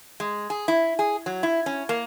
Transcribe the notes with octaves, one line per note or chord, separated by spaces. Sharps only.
G#3
G#4
E4
G#4
F#3
E4
C#4
A#3